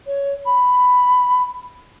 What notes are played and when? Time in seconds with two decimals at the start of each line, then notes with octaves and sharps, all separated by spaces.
0.07 C#5
0.46 B5